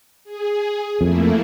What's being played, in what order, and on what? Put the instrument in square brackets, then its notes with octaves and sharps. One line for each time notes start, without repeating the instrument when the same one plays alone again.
[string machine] G#4
[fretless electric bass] F2 [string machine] A3 A#3 E4